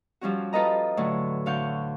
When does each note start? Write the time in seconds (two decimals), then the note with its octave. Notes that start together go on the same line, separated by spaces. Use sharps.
0.21 F3 G3 C#4 F#4
0.53 F4 A4 B4 D#5 A#5
0.97 A2 D3 F#3
1.46 D2 D3 F5 C#6 G6